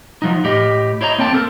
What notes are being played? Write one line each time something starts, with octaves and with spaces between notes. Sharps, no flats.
F3 F#3 D#4
A2 G4 D#5
E4 C5 C#5 D#5 A#5
A#3 C4 G5 A5
C4 A4 A#4